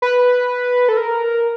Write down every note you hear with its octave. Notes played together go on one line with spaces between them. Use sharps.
B4
A4
A#4